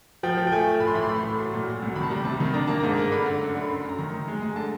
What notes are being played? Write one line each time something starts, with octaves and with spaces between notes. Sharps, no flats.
F3 G5
F3
G5
A3 G#5
A3
A2 B5
C6
E3 B5
C6
A3 B5
C6
A2 B5
F#3 C6
A#2
F#3
C2
D#3 B5
A5
G3 A#5
C3 A5
D#3
D4 A#5
A#3 A5
G#2 A#5
A#3
D3 B5
D3
F#2
D3
B5
F#2 C6
F#2 A#5
D#3 A#5
D#3
G#3
G#3
D3 A5